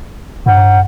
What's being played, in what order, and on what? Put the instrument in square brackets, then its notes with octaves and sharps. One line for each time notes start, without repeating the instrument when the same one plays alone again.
[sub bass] G2 [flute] F#5